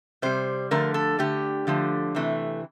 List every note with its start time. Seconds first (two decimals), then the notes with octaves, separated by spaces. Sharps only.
0.22 C3 G3 C5
0.71 D3 F3 A3 A#4
0.94 A4
1.19 D3 A3 G4
1.67 D3 F3 A3
2.15 C3 E3 A3